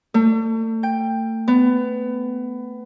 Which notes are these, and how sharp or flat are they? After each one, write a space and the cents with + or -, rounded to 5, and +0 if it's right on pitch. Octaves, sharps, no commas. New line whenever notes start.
A3 +35
G5 +10
B3 +20